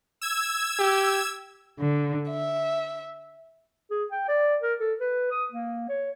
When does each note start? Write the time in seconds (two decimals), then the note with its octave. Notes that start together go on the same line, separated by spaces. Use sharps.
0.21 E6 G#6
0.79 G4
1.79 D3
2.30 E5
3.91 G#4
4.11 G5
4.29 D5
4.62 A#4
4.80 A4
5.00 B4
5.31 D#6
5.52 A#3
5.89 C#5